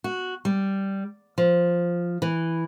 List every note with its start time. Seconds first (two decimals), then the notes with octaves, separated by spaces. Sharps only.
0.04 F#4
0.45 G3
1.38 F3
2.22 E3